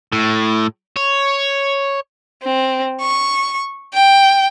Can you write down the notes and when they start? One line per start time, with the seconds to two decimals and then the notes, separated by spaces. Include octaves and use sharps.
0.12 A2
0.96 C#5
2.43 C4
3.01 C#6
3.94 G5